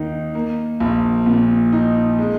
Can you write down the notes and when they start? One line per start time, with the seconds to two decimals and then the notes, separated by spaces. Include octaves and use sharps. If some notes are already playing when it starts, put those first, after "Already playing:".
Already playing: D#2 D#3 D#4
0.35 A#3
0.80 A#1
1.26 A#2
1.72 D#4
2.19 G#3